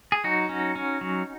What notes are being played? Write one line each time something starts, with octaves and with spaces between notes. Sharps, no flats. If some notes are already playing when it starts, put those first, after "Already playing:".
G#4
F#3 D#4 F#4
C#4
C#4
F#3